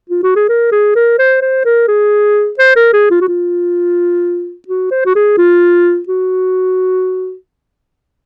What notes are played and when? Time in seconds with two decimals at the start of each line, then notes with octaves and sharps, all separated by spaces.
0.10 F4
0.23 F#4
0.36 G#4
0.49 A#4
0.72 G#4
0.95 A#4
1.18 C5
1.41 C5
1.65 A#4
1.88 G#4
2.58 C5
2.76 A#4
2.93 G#4
3.11 F4
3.21 F#4
3.28 F4
4.68 F#4
4.91 C5
5.05 F#4
5.15 G#4
5.38 F4
6.08 F#4